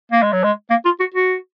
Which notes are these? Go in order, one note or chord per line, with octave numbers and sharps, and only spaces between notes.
A#3
G#3
F#3
G#3
A#3
F4
F#4
F#4